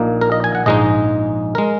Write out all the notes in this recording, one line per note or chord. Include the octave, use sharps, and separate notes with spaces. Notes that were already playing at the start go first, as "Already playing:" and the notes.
Already playing: A#1 A#2 A#3 D#4
A#4
D#5
G#5
F#5
A#1 G#2 G#3 D#4 D#5
G#3 A#4